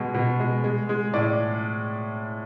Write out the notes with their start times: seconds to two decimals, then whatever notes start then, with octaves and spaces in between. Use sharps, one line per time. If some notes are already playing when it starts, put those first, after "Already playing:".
Already playing: B2 G#3
0.14 B2
0.40 G#3
0.64 G#3
0.89 G#3
1.14 A2 D5